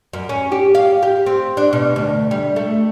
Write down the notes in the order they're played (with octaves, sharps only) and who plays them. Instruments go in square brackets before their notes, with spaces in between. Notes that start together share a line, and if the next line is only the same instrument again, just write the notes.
[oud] F#2
C#4
G4
F5
G4
C4
D4
B2
D2
G3
A3